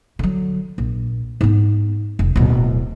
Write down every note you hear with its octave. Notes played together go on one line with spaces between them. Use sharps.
D3 F#3
A#1
G#2 B3
F1
D1 B2